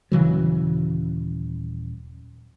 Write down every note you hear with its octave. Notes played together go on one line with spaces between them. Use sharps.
D#1 C#3 E3 F#3